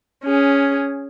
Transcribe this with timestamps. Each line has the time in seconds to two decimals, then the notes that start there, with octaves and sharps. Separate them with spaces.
0.25 C#4 G#4